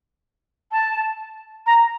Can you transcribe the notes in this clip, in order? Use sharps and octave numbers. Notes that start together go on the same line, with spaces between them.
A5
A#5